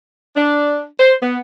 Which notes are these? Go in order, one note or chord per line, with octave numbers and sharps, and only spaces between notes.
D4
C5
B3